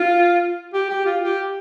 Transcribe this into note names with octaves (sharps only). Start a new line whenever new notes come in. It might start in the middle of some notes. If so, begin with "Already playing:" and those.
Already playing: F4
G4
G4
F4
G4